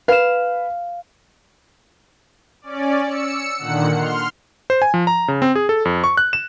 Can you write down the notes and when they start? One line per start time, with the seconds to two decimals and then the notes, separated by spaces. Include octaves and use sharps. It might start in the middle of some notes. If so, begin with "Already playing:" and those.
0.08 B4 F5 E7
2.62 C#4 D5
3.04 E6 C#7
3.57 A#2 D3 D#3 F#5 C#7
3.95 C6 F6
4.70 C5
4.82 G#5
4.94 F3
5.07 A#5
5.28 C#3
5.42 C4
5.55 G#4
5.69 A4
5.85 F2
6.04 C#6
6.17 F#6
6.33 E7